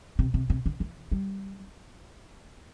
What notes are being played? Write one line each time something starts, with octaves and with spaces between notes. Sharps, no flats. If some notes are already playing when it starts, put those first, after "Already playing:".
C3
C3
C3
D3
E3
G3